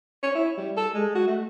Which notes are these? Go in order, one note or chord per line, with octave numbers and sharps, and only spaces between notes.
C#5
E4
G3
A4
G#3
F#4
A3